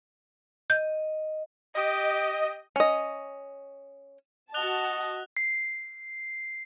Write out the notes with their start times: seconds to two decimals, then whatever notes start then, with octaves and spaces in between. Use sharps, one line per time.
0.70 D#5 G6
1.75 G4 D#5
2.76 C#4 D#5
4.54 F#4 D#5 A5 F#6 F7 G7
5.37 C7